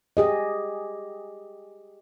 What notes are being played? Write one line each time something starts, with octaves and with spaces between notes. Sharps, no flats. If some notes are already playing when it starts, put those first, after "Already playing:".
G4 G#4 D#5